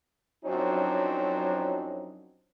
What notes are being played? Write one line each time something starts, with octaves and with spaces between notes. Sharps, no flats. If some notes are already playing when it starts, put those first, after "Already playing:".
F#2 F3 F#3 C4 D4 D#4